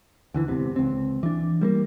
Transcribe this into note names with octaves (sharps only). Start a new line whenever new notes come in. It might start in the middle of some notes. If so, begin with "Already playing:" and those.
D2 D3 E3
G#1 E2 C3
C#2 C4
E3 D4
G3 A3 A#3